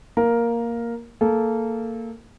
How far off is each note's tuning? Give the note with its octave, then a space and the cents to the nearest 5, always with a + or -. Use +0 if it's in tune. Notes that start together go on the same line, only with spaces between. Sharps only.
A#3 +0 A#4 +5
A#3 -20 A4 -25